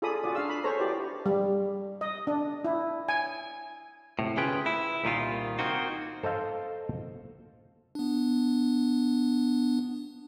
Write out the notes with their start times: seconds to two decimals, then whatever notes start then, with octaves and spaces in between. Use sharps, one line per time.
0.02 F4 G#4 A4 D5 B5 D#6
0.24 F4 F#4 G#4 D5
0.35 D4 F5 E6
0.49 B5
0.64 G#4 A4 C5 C#5 A#5
0.80 E4 F#4 G4 B4 D5
1.26 G3
2.01 D#5
2.27 D4
2.65 E4
3.09 G#5
4.19 A2 C3
4.37 D2 C#4 F4 G#4 B4 G5
4.66 E4
5.04 C2 A#2 D#3 F4
5.59 A#3 C4 D#4 F#4
6.23 A4 C5 D#5 F5
7.95 B3 D4